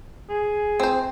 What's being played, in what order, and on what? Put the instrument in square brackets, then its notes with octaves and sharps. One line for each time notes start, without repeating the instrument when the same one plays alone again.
[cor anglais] G#4
[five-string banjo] C4 C5